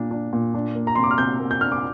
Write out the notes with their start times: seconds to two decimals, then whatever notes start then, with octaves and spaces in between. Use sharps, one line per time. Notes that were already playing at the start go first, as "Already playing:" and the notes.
Already playing: A#2 D4
0.11 D4
0.33 A#2
0.54 D4
0.75 A#3
0.87 A#5
0.95 C3 C6
1.03 D6
1.11 F6
1.18 C3 G6
1.40 A#3
1.51 G6
1.61 D4 F6
1.72 D6